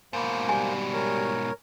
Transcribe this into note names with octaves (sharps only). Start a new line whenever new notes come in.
G#2 B2 A#3 C5
G3 G#5
A#4 C#5